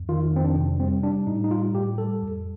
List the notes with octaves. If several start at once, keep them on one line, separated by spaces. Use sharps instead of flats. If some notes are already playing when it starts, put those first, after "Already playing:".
Already playing: F2
D#3 F4
F2 C4
D4
C3
G3 C4
G3 D4
A2 D#4
D#4
G3 F4
A2 G4
G3 A4
F2